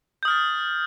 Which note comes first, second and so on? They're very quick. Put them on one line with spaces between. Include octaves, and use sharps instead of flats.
G6 D#6 F6 A6